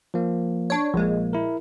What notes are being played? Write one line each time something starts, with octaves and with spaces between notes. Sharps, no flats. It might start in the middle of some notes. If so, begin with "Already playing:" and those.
F3 A#3
D4 C#5
A#1 F3 G#3 A#3
E4 A#4